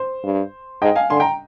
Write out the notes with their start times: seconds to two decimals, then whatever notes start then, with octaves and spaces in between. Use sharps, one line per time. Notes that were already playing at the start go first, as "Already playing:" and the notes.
Already playing: C5
0.24 G2
0.81 G#2 D#5 G5
0.96 F5 G#5
1.10 D3 G#5 C6
1.20 G5 A#5